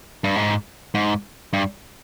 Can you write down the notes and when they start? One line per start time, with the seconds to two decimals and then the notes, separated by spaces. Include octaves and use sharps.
0.24 G2
0.36 G#2
0.95 G#2
1.53 G2